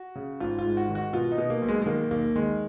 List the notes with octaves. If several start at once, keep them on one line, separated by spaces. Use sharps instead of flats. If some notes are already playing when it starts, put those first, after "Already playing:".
Already playing: F#4
C#3
G#1 F4
F4
G#2
F#4
D#3
F#4
B2 F4
D#4
B2
A#3
B1
G#3
G#3
D#3 A#3
D#2 A#3
D#3 G#3